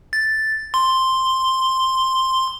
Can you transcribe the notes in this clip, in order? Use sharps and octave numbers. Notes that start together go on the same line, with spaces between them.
A6
C6